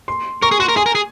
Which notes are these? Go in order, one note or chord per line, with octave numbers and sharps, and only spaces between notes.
C6
A#4 C#6
G#4
F#4 C6
A#4
G#4 G#5
A#4
G#4